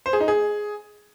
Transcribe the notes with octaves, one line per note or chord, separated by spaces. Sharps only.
C5
G#4
D#4
G#4